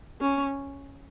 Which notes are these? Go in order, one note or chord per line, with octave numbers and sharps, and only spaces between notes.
C#4